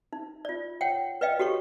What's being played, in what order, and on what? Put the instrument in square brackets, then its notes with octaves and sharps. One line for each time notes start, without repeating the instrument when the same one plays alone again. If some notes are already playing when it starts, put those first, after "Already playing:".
[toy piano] D#4
F4 D5
C#5 F#5 G5
B4 D5 D#5 F5 G5
F#4 G4 A4 C#5 C#6